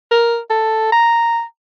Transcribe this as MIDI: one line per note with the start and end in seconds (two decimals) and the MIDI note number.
0.11 0.39 70
0.50 0.92 69
0.92 1.43 82